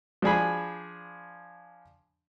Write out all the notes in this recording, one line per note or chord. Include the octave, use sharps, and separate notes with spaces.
F3 D4 G#4 B5